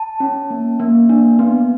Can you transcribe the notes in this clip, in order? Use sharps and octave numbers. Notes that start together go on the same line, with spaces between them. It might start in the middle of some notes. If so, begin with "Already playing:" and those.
Already playing: A5
C#4
A#3
A#3
D4
B3